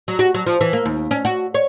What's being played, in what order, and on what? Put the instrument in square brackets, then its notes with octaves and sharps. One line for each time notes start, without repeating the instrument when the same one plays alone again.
[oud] F#3
F#4
F#3
F3
E3
A#3
D#2
C#4
F#4
C#5